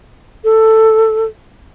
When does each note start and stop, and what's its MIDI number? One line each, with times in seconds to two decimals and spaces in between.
0.44 1.25 69